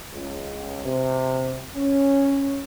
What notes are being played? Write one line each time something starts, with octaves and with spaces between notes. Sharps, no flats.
C#2
C3
C#4